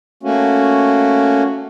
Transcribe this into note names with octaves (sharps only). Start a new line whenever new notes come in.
A3 A#3 C#4 F#4